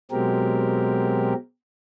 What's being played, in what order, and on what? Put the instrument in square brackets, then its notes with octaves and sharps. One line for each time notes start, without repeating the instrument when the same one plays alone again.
[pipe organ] B2 F#3 G#3 C4 G4 A#4